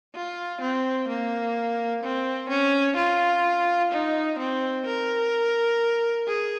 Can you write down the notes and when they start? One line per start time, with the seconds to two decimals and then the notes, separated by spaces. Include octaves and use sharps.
0.15 F4
0.61 C4
1.08 A#3
2.03 C4
2.49 C#4
2.97 F4
3.92 D#4
4.39 C4
4.86 A#4
6.27 G#4